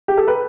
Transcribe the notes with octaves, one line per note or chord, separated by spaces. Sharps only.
G4
A4
B4